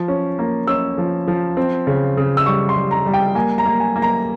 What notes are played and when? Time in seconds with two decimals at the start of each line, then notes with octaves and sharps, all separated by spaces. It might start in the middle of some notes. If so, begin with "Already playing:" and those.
Already playing: F3
0.08 C#4
0.39 A#3
0.67 C#4 E6
0.98 F3
1.28 F3
1.57 C4
1.87 C#3
2.17 C#3
2.37 E6
2.46 G3 C#6
2.69 C6
2.76 G3
2.91 A#5
3.06 G3
3.14 G5
3.35 A#3 G#5
3.58 A#5
3.65 A#3
3.80 G#5
3.96 A#3
4.02 A#5